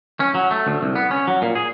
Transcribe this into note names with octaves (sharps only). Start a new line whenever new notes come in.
C#4
F#3
A3
D2
C2
B3
C#4
F#3
A#2
G#4